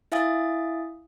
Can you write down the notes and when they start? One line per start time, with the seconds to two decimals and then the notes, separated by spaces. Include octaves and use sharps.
0.12 E4 E5 F5 G#5 D#6 A6